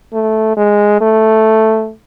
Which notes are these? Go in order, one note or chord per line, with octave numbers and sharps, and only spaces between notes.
A3
G#3
A3